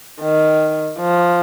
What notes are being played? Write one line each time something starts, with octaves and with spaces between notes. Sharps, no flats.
D#3
F3